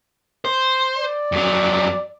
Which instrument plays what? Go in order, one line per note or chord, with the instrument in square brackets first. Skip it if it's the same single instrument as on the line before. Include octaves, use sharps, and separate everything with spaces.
[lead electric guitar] C5
[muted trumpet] D5
[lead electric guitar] F2 F#3